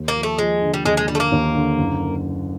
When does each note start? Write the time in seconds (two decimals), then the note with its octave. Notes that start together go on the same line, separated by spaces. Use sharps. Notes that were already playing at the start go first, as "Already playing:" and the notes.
Already playing: D#2
0.08 A#3
0.15 F3
0.23 A3
0.38 F3 G#3
0.62 D3
0.74 G3
0.85 D#2 G#3
0.97 G#3
1.08 D3 G3
1.15 A3
1.20 A#3
1.31 D#2
1.55 D3
1.78 F#1